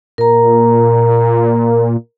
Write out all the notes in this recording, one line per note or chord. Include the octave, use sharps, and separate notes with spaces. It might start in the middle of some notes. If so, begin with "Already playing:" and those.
A#2 A#4 A#5